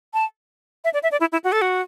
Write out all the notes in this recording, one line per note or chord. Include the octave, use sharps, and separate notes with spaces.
A5
E5
D5
E5
D5
E4
E4
F#4
A4
F#4